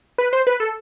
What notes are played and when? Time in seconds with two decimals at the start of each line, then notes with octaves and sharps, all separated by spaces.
0.18 B4
0.33 C5
0.47 B4
0.60 A4